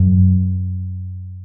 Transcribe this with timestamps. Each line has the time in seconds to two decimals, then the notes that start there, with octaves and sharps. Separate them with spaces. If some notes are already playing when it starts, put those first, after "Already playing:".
Already playing: F#2